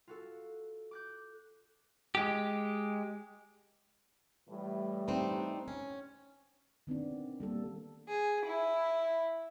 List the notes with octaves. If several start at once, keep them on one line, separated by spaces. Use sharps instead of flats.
F4 F#4 A4
D6 F#6 G6
G#3 G4
A2 E3 G3
C4 D4 D#4
C#4
D#3 B3 C4 D4
G3 A#3 A4
G#4
E4